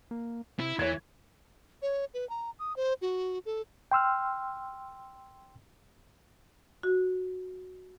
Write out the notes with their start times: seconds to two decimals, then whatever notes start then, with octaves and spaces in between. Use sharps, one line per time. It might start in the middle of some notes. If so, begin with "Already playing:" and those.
0.11 A#3
0.59 C3 E4
0.79 E2 E3 C#5 G#6
1.82 C#5
2.14 B4
2.29 A#5
2.59 D#6
2.76 C5
3.02 F#4
3.46 A4
3.92 G5 C6 E6 F6
6.83 F#4